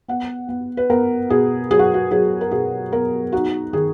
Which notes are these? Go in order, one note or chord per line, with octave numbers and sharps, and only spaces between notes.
B3 F#5
B3
B4
B3 A#4
B2 G#4
F#3 G#4
F#4
F#4
F#3 G#4
A#4
B2 G#4
B3 A#4
D#4 F#4
D#3 G#4